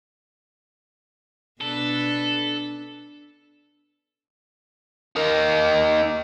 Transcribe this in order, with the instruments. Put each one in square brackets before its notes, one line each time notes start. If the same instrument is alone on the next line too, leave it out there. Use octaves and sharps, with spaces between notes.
[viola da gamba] B2 D4 B4 [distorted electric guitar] A4
[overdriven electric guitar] A#3 D#4